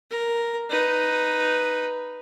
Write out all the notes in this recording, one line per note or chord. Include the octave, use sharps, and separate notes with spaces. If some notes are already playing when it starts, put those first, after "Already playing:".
A#4
D#4 B4